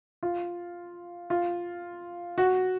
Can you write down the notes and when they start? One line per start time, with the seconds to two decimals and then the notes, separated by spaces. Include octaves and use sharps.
0.23 F4
1.30 F4
2.38 F#4